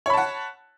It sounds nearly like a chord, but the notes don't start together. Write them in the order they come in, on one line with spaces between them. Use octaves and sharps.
C#5 B5 A5 F#5